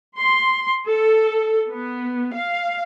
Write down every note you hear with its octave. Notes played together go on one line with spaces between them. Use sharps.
C6
A4
B3
F5